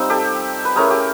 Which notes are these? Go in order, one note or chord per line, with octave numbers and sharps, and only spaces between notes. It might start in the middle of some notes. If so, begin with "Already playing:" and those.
Already playing: G3 C4 D#4 F4
G4 A4
B4
A3 C#4 E4 G#4 A#4
G4